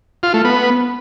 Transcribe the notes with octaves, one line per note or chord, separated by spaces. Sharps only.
F4
A3
B3